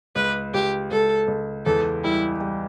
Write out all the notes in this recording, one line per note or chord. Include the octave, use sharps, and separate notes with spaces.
C#2 B4
C#2 G4
C#2 A4
C#2
E2 A4
G3 E4
G3